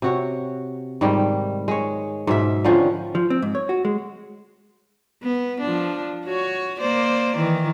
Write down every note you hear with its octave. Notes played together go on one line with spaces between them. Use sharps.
C3 F#4 C#5
G#2 D#3 G3
G#3 C#5
G#2 B2 E5
D3 D#3 F3 C#4
F3
C4
G#2
C#5
F#4
G#3
B3
F3 D4
F#4 C#5
A#3 C5 D5
D#3 E3